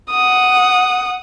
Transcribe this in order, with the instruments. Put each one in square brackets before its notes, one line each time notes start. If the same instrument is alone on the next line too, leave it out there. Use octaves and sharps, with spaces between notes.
[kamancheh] F#5 D#6